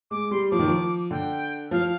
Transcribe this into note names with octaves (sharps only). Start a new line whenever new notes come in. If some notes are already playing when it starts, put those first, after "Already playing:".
G#3 D6
G3 C6
F3 D6
D#3
F3
D3 G5
F3 F5